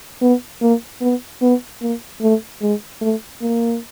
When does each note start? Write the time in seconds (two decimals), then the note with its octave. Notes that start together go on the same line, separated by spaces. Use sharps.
0.21 B3
0.61 A#3
1.02 B3
1.42 B3
1.81 A#3
2.22 A3
2.62 G#3
3.01 A3
3.42 A#3